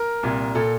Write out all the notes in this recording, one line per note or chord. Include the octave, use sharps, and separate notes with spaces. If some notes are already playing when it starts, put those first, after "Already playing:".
Already playing: A#4
C2 A#2
A#2 A4